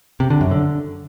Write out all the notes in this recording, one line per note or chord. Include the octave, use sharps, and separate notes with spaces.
C3
D3
F#2
D3